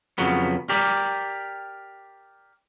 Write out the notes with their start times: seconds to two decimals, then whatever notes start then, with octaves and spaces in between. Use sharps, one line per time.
0.18 F2 C#3 F#3 B3
0.69 G4 A#4 D5